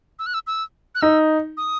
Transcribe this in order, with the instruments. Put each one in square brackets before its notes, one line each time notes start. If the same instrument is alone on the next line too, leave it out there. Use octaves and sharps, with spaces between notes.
[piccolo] E6
F#6
E6
E6
F#6
[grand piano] D#4 [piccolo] E6
[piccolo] D#6